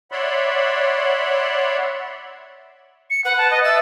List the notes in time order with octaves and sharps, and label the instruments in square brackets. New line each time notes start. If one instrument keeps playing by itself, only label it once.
[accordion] C#5 D5 E5 F#5 B5 C6
[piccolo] C#7
[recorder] B4 [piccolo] F#5
[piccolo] A5
D#5
[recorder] E5 [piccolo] A6